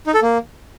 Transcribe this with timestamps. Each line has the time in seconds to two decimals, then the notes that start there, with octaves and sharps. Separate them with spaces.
0.07 D#4
0.14 A4
0.22 A#3